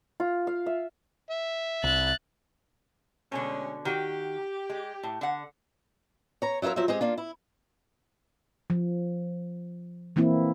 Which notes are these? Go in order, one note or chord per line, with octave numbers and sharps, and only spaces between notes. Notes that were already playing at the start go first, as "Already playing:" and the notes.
F4
F5
E5
E5
C2 F#6 A6
B2 D3 G#3 A3 C#4
D#3 F#4 G4 G5
G#3
A2
D3 F#5
C#5 A#5
F#3 E4 F4 A#4 E5
F3 F#3 C5 E5
G#3 C4 G4 G#4
A#3 D4 F4
E4
F3
E3 A#3 C4 E4